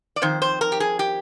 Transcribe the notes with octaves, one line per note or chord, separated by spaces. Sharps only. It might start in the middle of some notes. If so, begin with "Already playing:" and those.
D5
F2 D#3 C5
C5
A#4
G4
G#4
G4